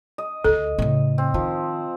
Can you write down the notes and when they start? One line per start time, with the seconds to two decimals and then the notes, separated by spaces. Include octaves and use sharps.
0.18 D#5
0.44 D2 A4
0.78 A2 C#3
1.18 C4
1.34 D#3 F3